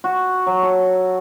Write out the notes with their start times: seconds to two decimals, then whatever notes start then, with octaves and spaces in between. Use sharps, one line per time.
0.04 F#4
0.46 F#3
0.63 A4